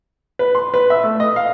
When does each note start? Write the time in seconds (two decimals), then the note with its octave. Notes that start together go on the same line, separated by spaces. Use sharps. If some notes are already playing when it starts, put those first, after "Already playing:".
0.39 B4
0.55 C6
0.74 B4
0.90 E5
1.04 A3
1.20 D#5
1.36 F5